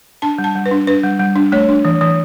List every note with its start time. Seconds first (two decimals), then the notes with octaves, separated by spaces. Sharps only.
0.22 D4 A5
0.38 G3
0.44 A5
0.55 G3
0.66 B4
0.71 D4
0.87 D4 B4
1.03 G3
1.20 G3
1.36 D4
1.52 A3 C#5
1.69 D4
1.85 E3
2.01 E3